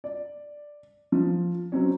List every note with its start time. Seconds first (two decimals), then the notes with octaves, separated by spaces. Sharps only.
0.04 D5
1.12 F3
1.72 F#3 C4 C#4